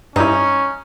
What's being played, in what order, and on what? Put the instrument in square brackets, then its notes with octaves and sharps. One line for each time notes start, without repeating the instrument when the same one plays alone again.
[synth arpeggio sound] G2 E4 [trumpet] C#4 [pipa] D#4